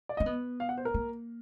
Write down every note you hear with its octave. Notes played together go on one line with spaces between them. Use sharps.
D5
C4 D#5
B3
F5
F#5
C5
A#4
A#3